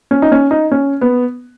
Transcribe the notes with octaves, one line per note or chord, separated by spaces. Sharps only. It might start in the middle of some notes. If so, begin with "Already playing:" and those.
C#4
D#4
C#4
D#4
C#4
B3